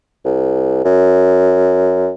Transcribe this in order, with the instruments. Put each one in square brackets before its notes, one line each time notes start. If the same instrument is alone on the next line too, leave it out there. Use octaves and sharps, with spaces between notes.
[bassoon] C2
F#2